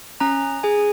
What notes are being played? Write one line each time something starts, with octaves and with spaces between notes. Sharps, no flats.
C#4 A#5
G#4 G#5